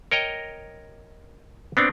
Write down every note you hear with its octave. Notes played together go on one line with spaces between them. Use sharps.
A#4 C#5 D#5 G5 A#5
B3 C4 D4